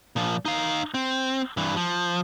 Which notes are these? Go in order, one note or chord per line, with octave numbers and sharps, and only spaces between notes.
A#2 F3
D#4 F5
C4
G2 E3
F3